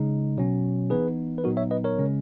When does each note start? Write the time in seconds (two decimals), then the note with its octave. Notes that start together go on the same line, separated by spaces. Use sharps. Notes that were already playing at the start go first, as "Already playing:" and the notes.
Already playing: C#3 G#3 D#4
0.37 B2 F#3 C#4
0.90 E3 B3 D#4 G#4 B4
1.38 B4
1.44 A#2 F#3 B3 D#4 F#4 A#4
1.57 C#5 E5
1.71 B4 D#5
1.84 A#4 C#5
1.98 C#3 G#3 C#4